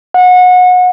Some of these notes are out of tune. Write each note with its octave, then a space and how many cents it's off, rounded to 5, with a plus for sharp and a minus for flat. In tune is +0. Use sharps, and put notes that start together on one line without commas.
F#5 -30